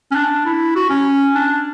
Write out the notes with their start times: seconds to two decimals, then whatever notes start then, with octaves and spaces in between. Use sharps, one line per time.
0.11 C#4
0.15 D4
0.46 E4
0.76 F#4
0.90 C#4
1.36 D4